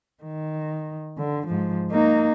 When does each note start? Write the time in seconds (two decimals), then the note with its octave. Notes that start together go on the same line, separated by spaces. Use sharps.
0.24 D#3
1.18 D3
1.47 G#2 F3
1.91 A#3 D#4